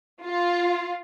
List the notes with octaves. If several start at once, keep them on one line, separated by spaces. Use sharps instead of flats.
F4